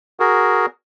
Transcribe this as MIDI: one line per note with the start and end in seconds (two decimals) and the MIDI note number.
0.20 0.66 66
0.20 0.66 68
0.20 0.66 70